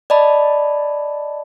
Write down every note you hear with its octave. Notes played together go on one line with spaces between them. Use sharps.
D5 D#5 A5 B5